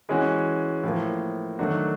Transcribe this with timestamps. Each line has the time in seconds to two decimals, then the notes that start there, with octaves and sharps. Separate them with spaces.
0.09 E3 G#3 C#4 F#4
0.83 A2 F3 A#3
1.59 D#3 F#3 A3 D4 F#4